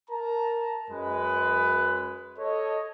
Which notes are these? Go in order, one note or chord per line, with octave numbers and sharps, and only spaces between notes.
A#4 A5 A#5
F#2 G#3 B4
A4 C#5 D#5